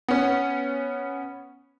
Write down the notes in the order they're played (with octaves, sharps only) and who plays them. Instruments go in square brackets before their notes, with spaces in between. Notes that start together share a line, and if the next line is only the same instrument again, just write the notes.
[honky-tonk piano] B3 C#4